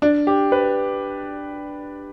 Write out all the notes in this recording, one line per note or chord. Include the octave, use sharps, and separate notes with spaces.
D4
G4
B4